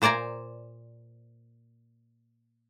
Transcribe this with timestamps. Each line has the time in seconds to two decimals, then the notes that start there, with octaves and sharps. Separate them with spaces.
0.02 A#2 C5 D5 G#5 A#5